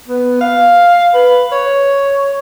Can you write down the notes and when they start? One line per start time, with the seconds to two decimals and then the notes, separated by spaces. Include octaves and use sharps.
0.08 B3
0.41 F5
1.14 B4
1.52 C#5